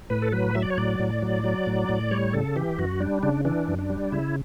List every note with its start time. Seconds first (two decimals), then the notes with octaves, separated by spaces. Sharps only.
0.10 A2 B4
0.22 A4
0.32 F#3 B4
0.55 F#3 E5
0.62 D5
0.70 C#5
0.77 A2 D5
1.00 A2
1.22 F#3
1.44 F#3
1.67 A2
1.89 A2
2.11 G3 C#5
2.33 C#3 A4
2.56 E3 G4
2.78 F#2 F#4
3.00 G3 D4
3.23 C#3 D4
3.45 E3 D4
3.68 F#2
3.79 D4
3.90 G3
4.12 C#3 E4